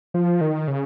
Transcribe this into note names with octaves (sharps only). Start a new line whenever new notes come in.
F3
D#3
C#3